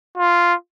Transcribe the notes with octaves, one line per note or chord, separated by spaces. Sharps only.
F4